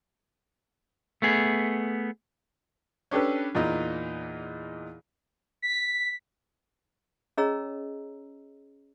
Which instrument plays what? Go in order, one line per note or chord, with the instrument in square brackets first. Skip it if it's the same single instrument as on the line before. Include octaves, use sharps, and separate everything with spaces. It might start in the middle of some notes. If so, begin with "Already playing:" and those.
[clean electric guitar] A3 B3 G#4
[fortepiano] C#4 D4 G4 A4 B4
E2 A#2 D#4
[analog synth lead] B6
[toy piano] C#4 G#4 C#5 D#5 A#5 E6